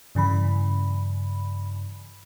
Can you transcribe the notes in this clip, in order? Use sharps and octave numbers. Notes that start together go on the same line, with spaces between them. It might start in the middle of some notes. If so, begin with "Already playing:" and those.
G2 C#3 E3 B5